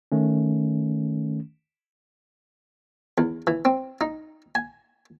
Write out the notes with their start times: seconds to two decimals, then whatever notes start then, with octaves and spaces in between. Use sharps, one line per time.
0.12 D#3 A3 C#4
3.18 E2
3.47 E3
3.65 C4
4.01 D#4
4.55 G#5